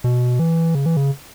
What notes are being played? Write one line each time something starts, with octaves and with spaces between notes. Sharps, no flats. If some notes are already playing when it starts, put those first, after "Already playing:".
B2
E3
C#3
E3
C#3